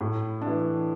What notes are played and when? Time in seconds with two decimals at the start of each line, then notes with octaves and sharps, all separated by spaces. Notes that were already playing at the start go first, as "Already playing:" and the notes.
0.01 A2
0.41 D4
0.47 E3